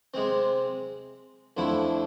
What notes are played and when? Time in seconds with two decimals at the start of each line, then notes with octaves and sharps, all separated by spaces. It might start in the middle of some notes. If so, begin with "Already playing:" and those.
0.14 C3 G#3 C4
1.57 F2 D3 F3 A3 E4